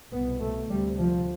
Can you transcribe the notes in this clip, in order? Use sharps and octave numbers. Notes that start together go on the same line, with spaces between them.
C2 B2 B3
A3
D2 C3 G3
F3